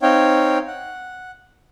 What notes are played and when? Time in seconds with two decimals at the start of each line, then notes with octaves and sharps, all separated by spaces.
0.02 C4 D#4 C#5 F5 G5
0.67 F#5